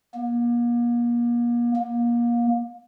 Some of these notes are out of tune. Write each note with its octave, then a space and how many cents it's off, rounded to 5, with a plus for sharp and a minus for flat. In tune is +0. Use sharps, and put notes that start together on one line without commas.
A#3 +40
A#3 +30